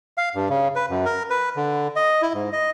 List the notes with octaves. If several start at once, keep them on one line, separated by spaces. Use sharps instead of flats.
F5
G2
C#3
B4
F#2
A#4
B4
D3
D#5
E4
G#2
D#5